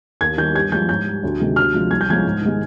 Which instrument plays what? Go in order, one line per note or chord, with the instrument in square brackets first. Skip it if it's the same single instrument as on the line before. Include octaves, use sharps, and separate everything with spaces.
[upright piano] D#2 G#6
D#3 G3 G6
G2 G#6
F3 G#3 G6
G#2 G6
G3
D2
C3 D#3 G#3
D2 F6
C3 F3 G#3
C2 G#6
G6
C3 F3 G#3 G#6
G#2
D#3 G#3